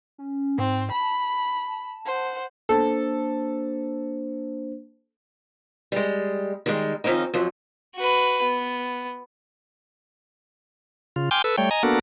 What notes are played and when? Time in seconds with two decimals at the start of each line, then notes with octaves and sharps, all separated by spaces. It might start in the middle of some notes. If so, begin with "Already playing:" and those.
0.18 C#4
0.58 G#2 C4
0.92 A5 B5
2.06 C5 F#5
2.69 A#3 D4 A4 C5
5.92 G3 G#3
6.66 D#3 G3 G#3
7.04 D#3 F3 C4 C#4 D#4
7.34 F2 F3 F#3
7.95 F#4 B4
8.43 B3
11.16 C#3 F4
11.31 G5 G#5 C6 D6 F6 G6
11.44 A4 B4 E6
11.58 G3 A3 C#5 G5
11.71 D#5 G#5 A#5
11.83 A#3 B3 D4 F#4 A4 A#4